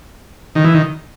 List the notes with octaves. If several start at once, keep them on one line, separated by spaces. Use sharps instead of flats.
D#3
E3
D#3